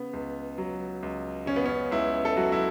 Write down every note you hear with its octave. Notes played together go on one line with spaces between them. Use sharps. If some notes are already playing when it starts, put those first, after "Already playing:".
Already playing: C#3 B3
C#2
F#3
C#2
C#3 C#4
B3
C#4
C#2 E4
A4
F#3 F#4
E4